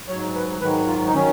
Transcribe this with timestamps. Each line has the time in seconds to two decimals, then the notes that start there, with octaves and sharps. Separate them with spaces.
0.08 G#2 F#3 C#5
0.35 B4
0.61 G#2 D#3 F#3 B4
0.87 F4
1.06 D#4
1.14 D#3 F#3 C#4